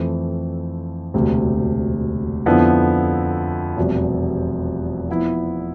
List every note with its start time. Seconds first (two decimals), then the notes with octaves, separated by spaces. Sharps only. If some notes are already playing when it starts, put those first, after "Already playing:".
Already playing: F2 E3 A3 C4 E4
1.14 E1 D2 C3
2.46 F2 D3 F3 B3 E4
3.77 F1 E2 B2 G3
5.10 F3 B3 E4